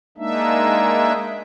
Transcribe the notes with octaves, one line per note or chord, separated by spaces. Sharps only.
G#3 A#3 D4 D#4 E5